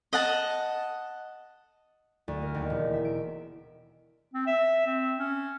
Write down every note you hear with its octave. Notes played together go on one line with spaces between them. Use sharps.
D#5 F#5 A5
D2
A#4
D#2
E1
E5
D7
C4
E5
C4
C#4